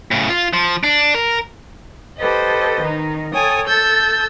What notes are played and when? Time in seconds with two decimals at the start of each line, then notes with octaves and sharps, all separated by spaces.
0.11 A2 C#3
0.29 F4
0.53 F3
0.84 D4
1.15 A#4
2.19 G4 A4 B4 C5 D#5
2.80 D#3 D#4
3.34 A4 C#5 G5 G#5 D#6
3.67 A4 E6 G6 A6